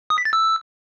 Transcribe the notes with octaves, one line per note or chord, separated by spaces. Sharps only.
D#6
B6
A6
E6